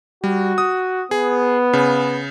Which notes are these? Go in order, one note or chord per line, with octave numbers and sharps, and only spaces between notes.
G3 F#4
D#6
B3 G#4
C#3